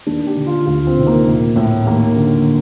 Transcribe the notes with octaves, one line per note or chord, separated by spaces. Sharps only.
D#2 D4
G4
D3
F4
D2 F4
C4
C3 D#3
A#3
A#1
A2
D#2 A#3
D3